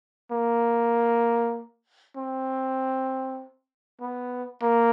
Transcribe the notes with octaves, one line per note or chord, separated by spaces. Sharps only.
A#3
C4
B3
A#3